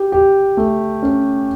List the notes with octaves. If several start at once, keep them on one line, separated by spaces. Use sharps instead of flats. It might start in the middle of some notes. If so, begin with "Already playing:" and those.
Already playing: G4
G4
A3
C#4